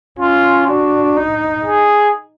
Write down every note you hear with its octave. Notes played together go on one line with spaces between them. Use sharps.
C#4 F4
D4 F#4
D#4
G#4